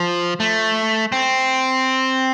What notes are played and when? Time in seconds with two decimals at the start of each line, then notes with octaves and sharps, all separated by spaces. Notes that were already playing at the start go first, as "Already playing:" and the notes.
Already playing: F3
0.40 A3
1.12 C4